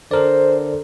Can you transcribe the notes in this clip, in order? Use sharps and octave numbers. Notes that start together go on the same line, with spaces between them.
D3 A4 A#4 C5 D5